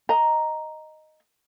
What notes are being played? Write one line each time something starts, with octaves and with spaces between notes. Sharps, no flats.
D#5 A#5